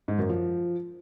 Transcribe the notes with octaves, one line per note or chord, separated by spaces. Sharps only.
G#2
F#2
F3